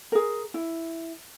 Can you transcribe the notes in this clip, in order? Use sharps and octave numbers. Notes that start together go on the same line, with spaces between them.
G#4 A#4
E4